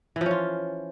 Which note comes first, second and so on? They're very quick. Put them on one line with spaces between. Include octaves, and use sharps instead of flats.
E3 F3 C#4 F4